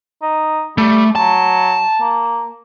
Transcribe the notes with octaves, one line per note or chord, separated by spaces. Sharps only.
D#4
G3 A3
F#3 A5
A#3